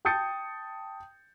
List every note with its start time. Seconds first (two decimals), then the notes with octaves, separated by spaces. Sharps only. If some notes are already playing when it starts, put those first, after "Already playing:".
0.05 G5 A5 D#6 G6 A6 C#7